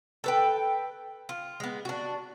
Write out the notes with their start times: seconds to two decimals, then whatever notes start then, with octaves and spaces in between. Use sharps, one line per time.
0.24 A4 B4 G5
1.29 F4
1.60 G#3 B3
1.85 D4 F#4